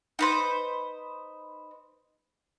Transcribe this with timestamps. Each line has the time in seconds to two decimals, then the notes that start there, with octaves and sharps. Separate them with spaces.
0.19 D#4 B4 C5